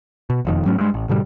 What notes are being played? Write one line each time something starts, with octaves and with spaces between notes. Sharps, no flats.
B2
E1 F2 D#3
G#2 F#3 A3 C#4
G2 G#3
A1
G#2 B2 D3 G3